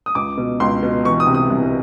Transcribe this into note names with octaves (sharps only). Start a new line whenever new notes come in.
D#6
C#2 D6
B2
C#2 C6
B2
E3 C#6
D#6
C3
D#6
C2